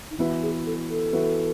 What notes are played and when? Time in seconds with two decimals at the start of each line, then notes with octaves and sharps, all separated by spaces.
0.10 D#4
0.18 E3 B3 E4 F#4 B4 E5
0.42 G#4
0.66 A4
0.90 A4
1.13 E3 B3 F#4 B4 E5